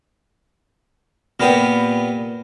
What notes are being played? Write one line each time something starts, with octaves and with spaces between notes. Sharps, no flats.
A#2 A#3 B3 G4 B5